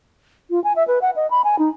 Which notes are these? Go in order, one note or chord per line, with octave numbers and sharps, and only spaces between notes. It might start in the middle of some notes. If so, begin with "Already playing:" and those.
F4
G#5
E5
B4
F#5
D#5
B5
G#5
D#4